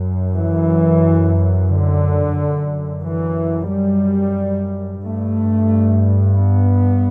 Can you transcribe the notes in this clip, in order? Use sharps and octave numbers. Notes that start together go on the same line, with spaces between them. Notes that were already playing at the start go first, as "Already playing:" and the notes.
Already playing: F#2
E3
D3
F#2
E3
G3
G2 A3
B3